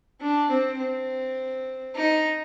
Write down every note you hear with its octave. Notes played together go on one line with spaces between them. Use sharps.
D4
C4
C4
D#4